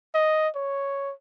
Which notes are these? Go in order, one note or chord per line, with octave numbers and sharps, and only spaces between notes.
D#5
C#5